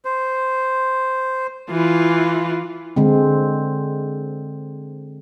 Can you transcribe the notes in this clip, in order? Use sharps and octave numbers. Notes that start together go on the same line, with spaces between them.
C5
E3 F4
D3 G#3 C4